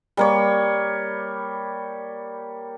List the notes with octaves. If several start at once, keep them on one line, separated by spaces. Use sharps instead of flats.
G3 A#3 C#5